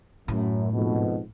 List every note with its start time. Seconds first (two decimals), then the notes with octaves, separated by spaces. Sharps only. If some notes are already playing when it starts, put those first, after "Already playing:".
0.28 F#2 A2
0.73 F2 G#2 B2